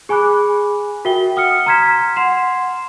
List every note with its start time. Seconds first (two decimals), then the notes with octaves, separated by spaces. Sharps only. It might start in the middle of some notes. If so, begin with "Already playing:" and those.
0.09 G#4 G#5 B5 D6 F#6
1.05 F#4 A#4 E5 G5 G7
1.36 F#5 D#6 F6 C#7
1.66 A#5 C6 F6 G#6 B6 E7
2.16 F#5 C6 C7 E7